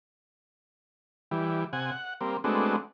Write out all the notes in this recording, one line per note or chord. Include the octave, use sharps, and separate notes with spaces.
E3 G3
C3 F#5 G#5
F#5
G3 A#3 C4
G#3 A3 B3 C4 D4 F#4